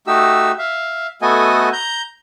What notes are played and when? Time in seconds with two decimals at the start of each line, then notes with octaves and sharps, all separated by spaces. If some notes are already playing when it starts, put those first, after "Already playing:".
0.07 A3 D#4 F#4 G4 E6
0.58 E5 F5
1.22 A3 B3 F#4 A4 D#5 G#5
1.73 A#5 G6